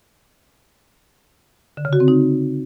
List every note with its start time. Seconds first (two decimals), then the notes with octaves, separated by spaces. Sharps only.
1.77 D3
1.85 C#3
1.93 F#4
2.00 C4
2.08 D#4